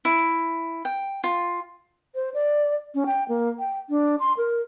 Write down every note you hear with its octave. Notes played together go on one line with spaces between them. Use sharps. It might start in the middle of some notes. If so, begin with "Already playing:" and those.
E4
G5
F4
C5
D5
C#4
G5
A#3
G5
D4
C6
A#4